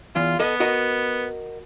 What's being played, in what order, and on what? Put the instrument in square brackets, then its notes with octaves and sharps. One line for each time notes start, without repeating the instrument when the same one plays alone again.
[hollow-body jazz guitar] E2 [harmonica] F4
[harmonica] B3 [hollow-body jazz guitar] A4 D#5
[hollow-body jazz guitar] F#4 A#4 D#5